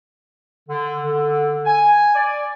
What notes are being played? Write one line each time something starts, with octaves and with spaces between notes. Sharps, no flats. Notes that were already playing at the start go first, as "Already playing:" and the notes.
D3
D3
G#5
D5